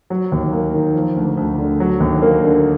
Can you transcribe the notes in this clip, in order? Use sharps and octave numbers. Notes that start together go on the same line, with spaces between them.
F#3
D#2
A#3
D#3
F3
D2
D2
D3
F#3
D#2
A#3
D3